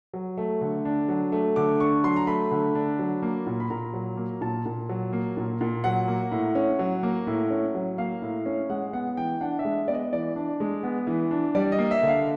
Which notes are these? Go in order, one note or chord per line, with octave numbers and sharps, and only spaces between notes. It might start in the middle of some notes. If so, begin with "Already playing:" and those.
F#3
A3
D3
D4
F#3
A3
D3 D6
D4 C#6
F#3 C6
A#5
A3 B5
D3
D4
F#3
A#3
A#2
B5
A#2 A#5
F#3
A#3
A#2 A5
A#2
F#3
A#3
A#2
A#2
F#3 F#5
A#3
A2
C#4
F#3
A#3
A2
C#4
F#3
A#3 F5
A2
C#4
G#3 F#5
B3 F#5
E3 G5
D4 F#5
E5
G#3
B3 D5
D#5
E3 D5
D4
G#3
B3
E3
D4
G3 D5
D#5
A#3
E5
D3
F5